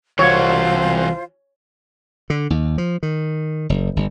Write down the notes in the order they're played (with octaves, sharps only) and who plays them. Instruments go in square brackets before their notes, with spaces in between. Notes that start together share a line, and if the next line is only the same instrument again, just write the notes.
[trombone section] C2 [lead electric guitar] E3 F#4 [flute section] F4 C5 [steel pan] C#5
[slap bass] D3
D#2
F3
D#3
F#1
G1